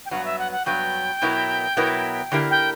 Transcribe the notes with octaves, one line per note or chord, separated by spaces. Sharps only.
G5
G2 F#3 B3 F#5
E5
F#5
F#5
G2 F#3 B3 G5
B2 F#3 B3 E4 A#4
B2 F#3 B3 E4 A#4
D3 A#3 E4 G4 A#4
G5